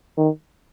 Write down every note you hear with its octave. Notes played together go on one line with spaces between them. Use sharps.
D#3